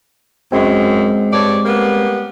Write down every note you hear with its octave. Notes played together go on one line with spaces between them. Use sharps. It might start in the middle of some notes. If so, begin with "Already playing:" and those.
F#2 G#3 C4
G2 C#5 D5
G3 A#3 B3